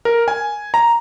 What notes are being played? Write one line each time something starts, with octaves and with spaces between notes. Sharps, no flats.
A#4
G#5
A#5